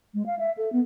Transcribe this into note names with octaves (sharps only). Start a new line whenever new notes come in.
G#3
F5
E5
A4
B3